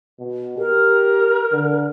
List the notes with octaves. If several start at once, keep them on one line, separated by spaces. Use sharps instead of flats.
B2
G4 A#4
D3